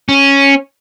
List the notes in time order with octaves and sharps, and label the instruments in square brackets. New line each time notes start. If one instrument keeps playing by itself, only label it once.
[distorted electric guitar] C#4